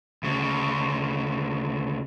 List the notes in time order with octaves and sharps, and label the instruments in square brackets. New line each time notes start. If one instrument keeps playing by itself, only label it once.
[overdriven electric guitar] D2 C#3